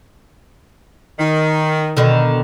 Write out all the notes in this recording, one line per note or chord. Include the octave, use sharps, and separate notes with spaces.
D#3
B2 D3 D#3